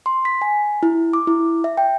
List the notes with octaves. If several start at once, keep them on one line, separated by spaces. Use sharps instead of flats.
C6
B6
G#5
E4
D6
E4
E5
G5